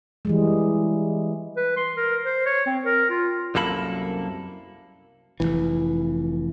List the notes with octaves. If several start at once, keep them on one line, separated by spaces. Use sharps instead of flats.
E3 G3 G#3
B4
C6
A#4
C5
C#5
C4
A#4
F4
C2 F#2 A#3 A4 B5
F1 C#2 E3